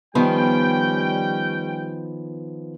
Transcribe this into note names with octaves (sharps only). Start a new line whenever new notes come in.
D#3 F3 G3 B3 C#4 G5